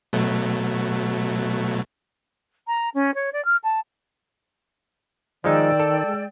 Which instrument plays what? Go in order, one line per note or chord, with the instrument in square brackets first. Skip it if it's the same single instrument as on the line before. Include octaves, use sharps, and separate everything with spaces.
[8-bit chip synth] B2 F#3 A3
[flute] A#5
C#4
C#5
D5
F6
A5
[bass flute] D#3 [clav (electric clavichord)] F3 G#3 D#4 [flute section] D5 G5 E6
[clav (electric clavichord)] A4
[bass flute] G#3